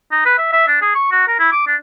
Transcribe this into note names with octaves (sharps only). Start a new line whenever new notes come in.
D#4
B4
E5
E5
D4
G#4
C#6
F#4
A#4
E4
D6
D4